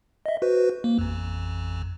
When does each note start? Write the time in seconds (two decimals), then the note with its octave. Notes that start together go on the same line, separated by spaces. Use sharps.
0.26 D#5 E5
0.42 F#4 B4 C5
0.84 A#3
0.98 A1 F2